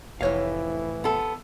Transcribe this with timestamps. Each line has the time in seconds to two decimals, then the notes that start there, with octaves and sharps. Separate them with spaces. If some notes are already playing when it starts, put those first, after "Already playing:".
0.21 F1 A2 E3 C#5 F5
1.04 B3 A4